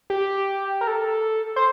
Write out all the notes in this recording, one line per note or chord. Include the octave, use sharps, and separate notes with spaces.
G4
A#4
A4
C5